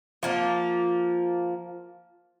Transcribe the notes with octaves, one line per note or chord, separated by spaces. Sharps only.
F3 A#3 F4